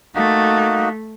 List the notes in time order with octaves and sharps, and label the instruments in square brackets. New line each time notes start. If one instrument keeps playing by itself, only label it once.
[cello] A3 [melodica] A#3 D#4 F#4